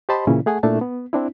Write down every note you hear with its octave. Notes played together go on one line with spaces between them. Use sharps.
G4 C5 D#5 A5 B5 C6
A#2 C#3 E3 C#4 E4
A3 G#4 F#5 G#5
A#2 A3 D4 E4 A5
B3
C4 D4 E4